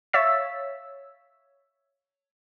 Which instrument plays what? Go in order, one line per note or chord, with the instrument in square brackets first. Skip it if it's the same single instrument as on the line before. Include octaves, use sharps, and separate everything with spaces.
[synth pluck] C#5 E5 F5 E6 A6 B6